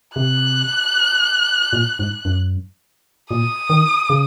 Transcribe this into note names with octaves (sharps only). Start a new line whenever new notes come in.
C3 F#6
A#2
G#2
F#2
A#2 D#6
D#3
C#3